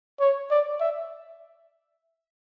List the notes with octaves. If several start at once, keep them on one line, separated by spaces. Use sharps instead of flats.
C#5
D5
E5